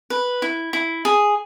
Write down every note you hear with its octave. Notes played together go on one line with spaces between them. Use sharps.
B4
E4
E4
G#4